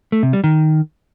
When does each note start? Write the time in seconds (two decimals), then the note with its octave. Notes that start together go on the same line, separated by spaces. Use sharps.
0.12 A3
0.23 C3
0.33 G3
0.44 D#3